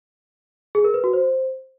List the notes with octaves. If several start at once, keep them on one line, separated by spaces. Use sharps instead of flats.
G#4
A#4
B4
F#4
C5